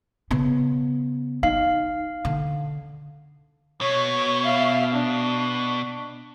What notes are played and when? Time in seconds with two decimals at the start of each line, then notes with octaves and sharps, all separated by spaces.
0.31 C#3 B3
1.43 D#4 F5
2.25 D3
3.81 B2 C#5
4.46 E5 F5
4.94 D4